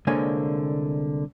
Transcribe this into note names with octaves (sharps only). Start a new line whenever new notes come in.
C2 D3 G#3 A#3 C#5 G#5